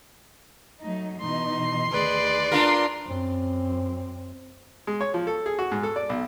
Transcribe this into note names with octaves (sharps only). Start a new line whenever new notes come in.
F#3 A3 D#4
B2 E3 D#4 C6
D2 D#3 G#4 B4 D5
D4 F4 A#4 C6
F#2 C4
G#3
C#5
F3
A4
G#4
F#4
G#2
A4
D5
B1